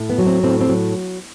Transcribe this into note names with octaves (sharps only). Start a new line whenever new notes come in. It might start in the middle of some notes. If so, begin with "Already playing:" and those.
Already playing: A2
B3
F#3
C4
A2 C4
C4
F#3